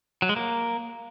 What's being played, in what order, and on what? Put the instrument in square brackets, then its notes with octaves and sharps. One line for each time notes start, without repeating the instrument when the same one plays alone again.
[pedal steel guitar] F#3
G#3
A#3